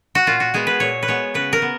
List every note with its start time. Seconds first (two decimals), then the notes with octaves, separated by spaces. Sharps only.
0.15 F#4
0.26 A#2 F4
0.40 F#4
0.54 G#3 B3 G#4
0.67 B4
0.80 A#2 C#5
1.03 B4
1.08 G#3 B3 C#5
1.34 C#3 B4
1.53 A#4
1.62 B3